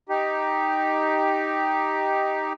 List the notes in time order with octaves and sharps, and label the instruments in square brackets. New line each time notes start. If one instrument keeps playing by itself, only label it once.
[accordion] D#4 G4